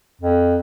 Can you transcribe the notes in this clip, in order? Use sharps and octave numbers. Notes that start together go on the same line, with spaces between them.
F2